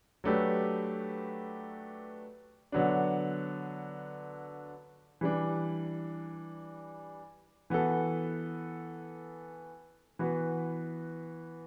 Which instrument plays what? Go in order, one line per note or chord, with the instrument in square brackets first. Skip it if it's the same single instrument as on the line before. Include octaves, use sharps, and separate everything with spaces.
[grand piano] F#3 A3 D4 G4 B4
D3 F#3 B3 D4
E3 G3 D4
E3 B3 F#4 A4
E3 B3 F#4 B4